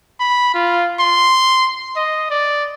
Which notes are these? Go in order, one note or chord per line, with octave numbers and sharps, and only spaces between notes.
B5
F4
C6
D#5
D5